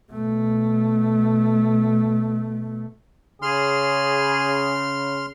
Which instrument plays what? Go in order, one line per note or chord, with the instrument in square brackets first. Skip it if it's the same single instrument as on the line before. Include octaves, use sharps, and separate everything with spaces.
[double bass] B2 A3
[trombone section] C#3 [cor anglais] G#4 [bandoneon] C6 F6